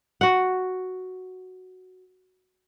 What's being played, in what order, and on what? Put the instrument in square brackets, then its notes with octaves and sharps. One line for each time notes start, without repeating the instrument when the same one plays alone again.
[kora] F#4 F#5